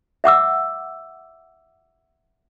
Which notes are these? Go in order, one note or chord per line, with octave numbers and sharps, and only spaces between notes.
E5 F#5 D6 E6